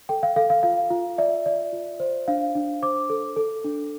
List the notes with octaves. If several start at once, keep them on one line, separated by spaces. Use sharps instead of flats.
A4 G5
F5
A4 F5
F5
F4 F5
F4
D5 E5
D5
F4
C5
D4 F5
D4
C5 D6
A4
A4
D4